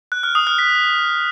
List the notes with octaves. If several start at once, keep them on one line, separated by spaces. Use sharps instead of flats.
F#6
F6
D#6
F6
B6